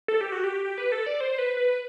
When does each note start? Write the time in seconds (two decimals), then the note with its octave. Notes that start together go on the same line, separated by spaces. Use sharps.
0.08 A4
0.21 G4
0.32 F#4
0.44 G4
0.65 G4
0.78 B4
0.92 A4
1.06 D5
1.20 C5
1.38 B4
1.57 B4